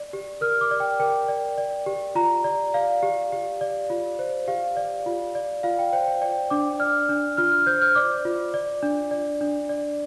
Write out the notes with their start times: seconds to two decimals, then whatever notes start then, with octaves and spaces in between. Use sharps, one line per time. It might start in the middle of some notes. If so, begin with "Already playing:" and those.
Already playing: D5
0.13 G4
0.41 A#4 F6
0.61 D6
0.71 D5
0.80 G5
1.00 A#4 G5
1.28 D5
1.58 D5
1.86 G4
2.15 F4 A#5
2.44 D5
2.74 D5 F5
3.02 G4
3.32 G4
3.61 D5
3.90 F4
4.19 C5
4.48 G4 F5
4.77 D5
5.06 F4
5.35 D5
5.63 F4 F5
5.79 G5
5.93 C5 G5
6.07 G5
6.22 D5 G5
6.50 D4 D6
6.79 D5 F6
7.09 D4
7.37 F4 F6
7.52 F6
7.66 C5 G6
7.82 F6
7.95 D5 D6
8.25 F4
8.54 D5
8.83 D4
9.11 D5
9.41 D4
9.69 D5